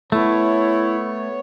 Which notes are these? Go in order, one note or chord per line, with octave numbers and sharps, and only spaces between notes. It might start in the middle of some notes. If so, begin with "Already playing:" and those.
A3 B3 E4 C#5